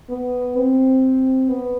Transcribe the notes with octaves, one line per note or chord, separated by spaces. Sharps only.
B3
C4
B3